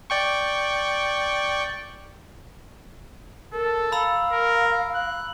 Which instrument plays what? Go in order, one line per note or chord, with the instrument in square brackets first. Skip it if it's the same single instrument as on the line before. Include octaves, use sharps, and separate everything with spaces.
[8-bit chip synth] D5 G5 C#6
[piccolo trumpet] A4 [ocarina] A#4
[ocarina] F5 [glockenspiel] A#5 B5 E6
[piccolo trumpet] A#4
F#6